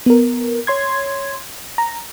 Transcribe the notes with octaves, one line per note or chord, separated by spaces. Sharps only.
B3 A#4
C#5 C6 G#6
A#5